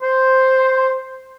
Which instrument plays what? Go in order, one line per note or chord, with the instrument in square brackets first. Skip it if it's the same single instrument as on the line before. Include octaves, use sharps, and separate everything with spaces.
[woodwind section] C5